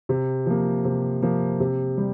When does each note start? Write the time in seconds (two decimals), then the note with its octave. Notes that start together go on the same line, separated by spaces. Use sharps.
0.09 C3
0.46 F3 A#3
0.85 C3
1.22 F3 A#3
1.60 C3
1.98 G3